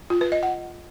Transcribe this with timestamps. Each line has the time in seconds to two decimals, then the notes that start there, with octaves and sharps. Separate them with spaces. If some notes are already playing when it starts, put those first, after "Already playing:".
0.10 F4
0.21 B4
0.32 D#5
0.43 F#5